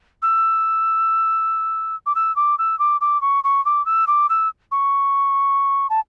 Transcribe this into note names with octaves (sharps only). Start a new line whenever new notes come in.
E6
D6
E6
D6
E6
D6
D6
C#6
C#6
D6
E6
D6
E6
C#6
A5